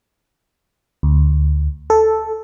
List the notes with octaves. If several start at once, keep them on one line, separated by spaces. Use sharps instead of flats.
D2
A4